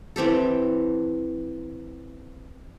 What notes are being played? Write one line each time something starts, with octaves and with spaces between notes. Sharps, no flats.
E3 C4 G4 A4